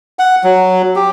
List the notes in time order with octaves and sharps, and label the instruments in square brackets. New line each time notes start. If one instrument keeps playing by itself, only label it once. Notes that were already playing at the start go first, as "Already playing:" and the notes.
[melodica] F#5
F#3
G4